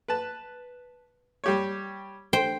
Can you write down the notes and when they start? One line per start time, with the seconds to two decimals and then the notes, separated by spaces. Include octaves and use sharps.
0.08 B4 A5
1.44 G3 G4 C#5
2.33 C5 G5